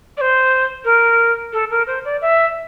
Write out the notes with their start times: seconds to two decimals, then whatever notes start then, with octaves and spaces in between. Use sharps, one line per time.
0.17 D5
0.21 C5
0.85 A#4
1.53 A4
1.71 A#4
1.87 C5
2.05 D5
2.22 E5